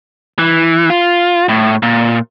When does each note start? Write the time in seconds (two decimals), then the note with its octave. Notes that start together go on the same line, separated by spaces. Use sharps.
0.39 E3
0.90 F4
1.49 A2
1.83 A#2